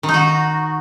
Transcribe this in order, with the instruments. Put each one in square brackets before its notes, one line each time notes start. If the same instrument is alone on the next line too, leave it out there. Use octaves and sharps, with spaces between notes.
[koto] D#3
D#4
F#4